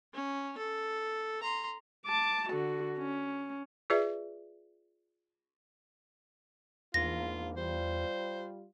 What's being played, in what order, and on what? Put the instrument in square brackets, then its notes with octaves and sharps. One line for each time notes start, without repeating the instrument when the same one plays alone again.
[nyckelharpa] C#4
A4
A#5 C6
[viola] A5 D6
D3 F#4
C#4
[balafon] F4 G#4 B4 D5 E5
[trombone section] A#1 G#2 A#3 [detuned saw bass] E2 [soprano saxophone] F4 [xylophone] A#6
[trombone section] G3 F4 [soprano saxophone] C5